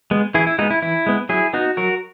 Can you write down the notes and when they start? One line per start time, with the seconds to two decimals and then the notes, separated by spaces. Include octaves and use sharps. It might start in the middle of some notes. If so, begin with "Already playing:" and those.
0.11 G#3 B3
0.34 E3 E4 G#4
0.47 E4
0.59 G#3 B3 D#4 F#4
0.70 E4
0.82 E3 E4
1.06 G#3 B3
1.29 F#3 E4 G#4
1.53 B3 D#4 F#4
1.77 F#3 F#4 A#4